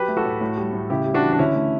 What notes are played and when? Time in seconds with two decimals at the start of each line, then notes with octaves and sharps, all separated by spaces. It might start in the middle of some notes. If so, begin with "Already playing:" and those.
Already playing: F#3 G4 B4
0.08 A3
0.17 F#4 A4
0.25 A2
0.41 A2
0.57 G3
0.73 A2
0.90 C#3 E4 G4
1.06 G3
1.14 D4 F#4
1.22 E3
1.33 D4
1.39 D3 C#4 E4
1.55 A3